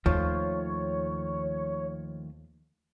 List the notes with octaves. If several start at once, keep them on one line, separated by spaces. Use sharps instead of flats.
D#2 D#3 F3 A3 F4 C#5